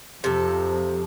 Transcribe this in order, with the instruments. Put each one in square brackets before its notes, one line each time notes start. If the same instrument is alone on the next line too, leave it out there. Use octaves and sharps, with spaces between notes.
[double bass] F2 F3 [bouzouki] C3 A4